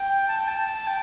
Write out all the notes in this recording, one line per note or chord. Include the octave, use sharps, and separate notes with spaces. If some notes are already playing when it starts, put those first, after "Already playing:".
Already playing: G5
A5
G5
A5
G5